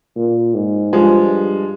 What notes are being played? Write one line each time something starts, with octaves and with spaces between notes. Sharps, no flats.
A#2
G#2
G2 F3 G#3